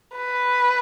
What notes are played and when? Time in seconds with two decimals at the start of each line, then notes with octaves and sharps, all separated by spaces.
0.15 B4